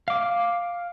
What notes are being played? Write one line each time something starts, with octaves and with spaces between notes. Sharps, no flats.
F5 D6